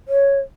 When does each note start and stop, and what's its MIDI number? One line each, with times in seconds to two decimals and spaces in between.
0.08 0.40 73